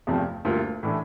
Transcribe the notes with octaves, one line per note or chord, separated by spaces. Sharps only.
E2 C3 F3 A3 C4
D2 D3 G3 A#3 F4
A2 E3 A3 D4